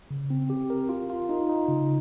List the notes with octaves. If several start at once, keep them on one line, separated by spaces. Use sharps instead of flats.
C#3
C4
G4
A#4
F4
F4
D#4
D#4
C#3